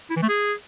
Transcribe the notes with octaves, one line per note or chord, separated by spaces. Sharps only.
E4
E3
A3
G#4